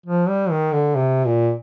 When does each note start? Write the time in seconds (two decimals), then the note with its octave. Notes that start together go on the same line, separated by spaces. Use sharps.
0.06 F3
0.28 G3
0.50 D#3
0.72 D3
0.96 C3
1.25 A#2